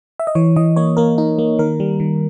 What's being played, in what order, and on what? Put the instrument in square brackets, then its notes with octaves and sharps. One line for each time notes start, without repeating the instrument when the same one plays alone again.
[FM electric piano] E5
D#5
E3 C#5
E3 D#5
A#3 C#5
A#3 A#4
D#4
A#3
D#3 A#4
G3
D#3